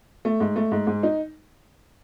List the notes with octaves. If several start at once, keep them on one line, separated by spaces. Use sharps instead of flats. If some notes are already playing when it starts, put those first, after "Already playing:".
A3
G#2
A3
G#2
G#2
D#4